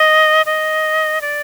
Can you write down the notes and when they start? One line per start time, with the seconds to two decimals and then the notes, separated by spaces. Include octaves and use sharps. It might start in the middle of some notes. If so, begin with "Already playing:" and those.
Already playing: D#5
0.46 D#5
1.21 D5